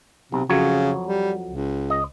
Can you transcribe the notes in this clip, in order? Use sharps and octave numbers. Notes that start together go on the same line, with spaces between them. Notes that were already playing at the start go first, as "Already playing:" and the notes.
B1 C3
F2 C#3 F#3 C#5
G3
C#2
D#5